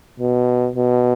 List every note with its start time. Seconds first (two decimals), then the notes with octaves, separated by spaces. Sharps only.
0.20 B2
0.75 B2